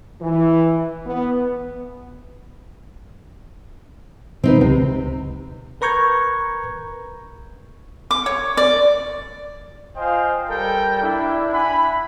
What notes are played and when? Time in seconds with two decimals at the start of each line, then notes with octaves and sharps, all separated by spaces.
0.21 E3
1.06 B3
4.44 B2 D3 F#3 C4 D#4 B4
4.61 C#2 C3
5.81 A#4 B4 A#5 C#6 G6 G#6
8.11 D6
8.26 C#5
8.57 D5
9.97 F4 C5 D#5 F5 G5 G#5
10.49 G3 A4 A#4 G5
11.02 D4 E4
11.53 E5 F#5 G#5 B5